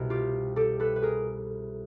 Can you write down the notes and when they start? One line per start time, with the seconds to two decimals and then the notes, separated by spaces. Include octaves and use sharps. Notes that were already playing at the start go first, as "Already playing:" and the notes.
Already playing: C2 B2
0.10 F4 G4
0.56 G4 A4
0.80 A4 B4
0.96 B4
1.02 G#4 A#4